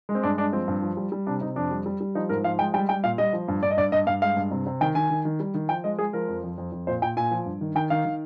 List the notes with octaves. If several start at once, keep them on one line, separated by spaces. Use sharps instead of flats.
G#3
C4
G2 D4
G#3 D4
F3 C4
G2
F3
G3
G3
C3 D4
C3 D#4
F2 D4
G3
G3
G3
F3 D#4
G#2 A#4
F3 F5
G#3 G5
G3 G5
G3 G5
A#2 F5
G3 D#5
F3
G2
G2 D5
D#5
G2 D5
G2 D#5
G2 F5
G#3 F5
G2
C3
C3
D#3 G5
D#3 G#5
D#3
D#3
G3
D#3
F3 G5
G#3 D#5
G#3 G#4
F3 A#4
F2
F2
F2
F2
A#2 C5
A#2 G5
A#2 G#5
F3
G2
D#3
D#3 G5
D#3 F5
D#3